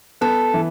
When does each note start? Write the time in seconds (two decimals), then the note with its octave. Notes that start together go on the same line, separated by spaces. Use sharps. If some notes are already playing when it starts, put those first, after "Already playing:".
0.21 B3 A4
0.54 E3